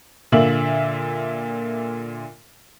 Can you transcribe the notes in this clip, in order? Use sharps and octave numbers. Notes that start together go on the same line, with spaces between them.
A#2 D3 A#3 E5 F#7